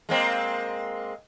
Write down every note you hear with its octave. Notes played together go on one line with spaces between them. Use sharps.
G#3 A#3 C4